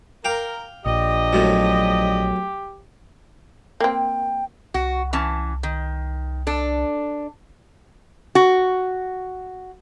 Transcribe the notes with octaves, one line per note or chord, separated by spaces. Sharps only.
A#4 F5 G5 D6
A#1 F3 D4 G4 D#5
B1 F#2 A2
A#3 C4 G5
C2 F#4
E3 C#4 A5
D#3
D4 A4
F#4